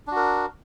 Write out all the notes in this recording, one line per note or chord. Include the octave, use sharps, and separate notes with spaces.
D4 F#4 A#4